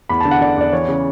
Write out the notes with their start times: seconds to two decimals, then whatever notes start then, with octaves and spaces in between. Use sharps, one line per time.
0.09 E2 B5
0.20 D3 A5
0.31 F#5
0.41 D3 D5
0.57 E2 D5
0.73 E3 C#5
0.88 C#3